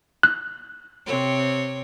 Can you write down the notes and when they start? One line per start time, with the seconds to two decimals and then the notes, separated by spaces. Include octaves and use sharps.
0.23 F#6
1.06 C3 C4 C#5